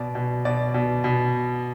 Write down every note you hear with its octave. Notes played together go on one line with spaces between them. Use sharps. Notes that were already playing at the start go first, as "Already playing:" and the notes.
Already playing: B2 D5
B2
B2 D5
B2
B2